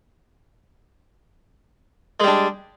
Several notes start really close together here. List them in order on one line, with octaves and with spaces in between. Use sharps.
G#3 G3 D4